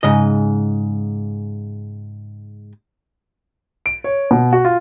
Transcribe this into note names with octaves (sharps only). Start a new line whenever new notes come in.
G#2 C#3 D#5
D7
C#5
B2
F#4
F4